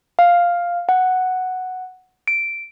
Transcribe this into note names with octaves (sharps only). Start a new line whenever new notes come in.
F5
F#5
D7